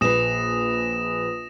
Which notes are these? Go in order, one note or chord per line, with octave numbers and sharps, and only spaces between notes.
A#1 B4 D#6 A#6 E7